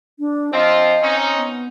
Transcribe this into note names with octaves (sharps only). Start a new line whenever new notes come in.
D4
F3 C4 F4 D#5
C4 C#4 D#4
B3